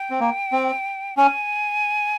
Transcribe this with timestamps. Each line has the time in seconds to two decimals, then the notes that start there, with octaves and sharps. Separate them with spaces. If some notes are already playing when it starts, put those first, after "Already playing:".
Already playing: G5
0.10 C4
0.20 A#3
0.52 C4
1.17 C#4 G#5